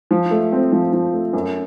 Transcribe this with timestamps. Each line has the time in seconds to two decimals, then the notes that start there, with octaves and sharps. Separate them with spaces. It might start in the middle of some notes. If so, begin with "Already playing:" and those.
0.11 F3
0.31 A3
0.52 C4
0.72 F3
0.93 F3
1.14 A3
1.33 F#2